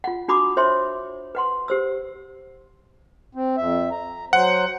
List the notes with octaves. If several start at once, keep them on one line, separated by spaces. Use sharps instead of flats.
F4 F#5
D4 F#4 B5 D6 D#6
D4 C5 C#5 E5 C6
B4 F#5 C6
G4 C5 E6
C4
F2 E5
A#5
F#3 C5 F#5